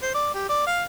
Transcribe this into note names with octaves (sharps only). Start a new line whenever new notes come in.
C5
D5
G4
D5
F5